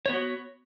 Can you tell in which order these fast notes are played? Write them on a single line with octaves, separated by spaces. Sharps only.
C#5 B3 F#4